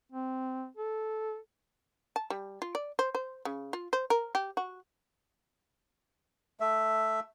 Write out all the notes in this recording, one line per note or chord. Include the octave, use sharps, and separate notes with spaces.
C4
A4
A5
G3
F4
D5
C5
C5
C#3
F4
C5
A#4
G4
F#4
A3 E5